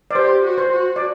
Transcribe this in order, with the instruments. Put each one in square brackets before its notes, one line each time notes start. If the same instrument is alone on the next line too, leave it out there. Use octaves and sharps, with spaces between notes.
[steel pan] D5
[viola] G4 [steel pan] C5
[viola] F#4
[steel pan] C5
[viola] F#4
[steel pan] D5